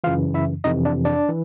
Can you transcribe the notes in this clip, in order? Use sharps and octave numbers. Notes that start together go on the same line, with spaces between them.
F#2 C#3 E3 F4 F5
E4 E5
F2 C3 E3 D#4 D#5
D4 D5
D4 D5
E3